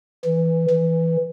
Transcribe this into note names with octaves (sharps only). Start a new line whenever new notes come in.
E3
E3